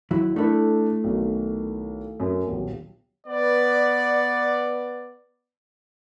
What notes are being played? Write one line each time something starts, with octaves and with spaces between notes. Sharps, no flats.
D#2 F#3 E4
A3 D4 E4 A4
B1 D#3
F#2
D#1 B1
B3 B4 D5